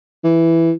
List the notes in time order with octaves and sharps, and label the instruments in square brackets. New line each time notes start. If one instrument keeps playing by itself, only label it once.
[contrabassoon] E3